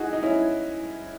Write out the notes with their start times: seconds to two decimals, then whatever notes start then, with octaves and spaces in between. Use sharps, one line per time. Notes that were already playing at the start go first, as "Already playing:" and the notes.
Already playing: D#4 E4 F#4 G#4
0.13 D#4
0.23 C#4 E4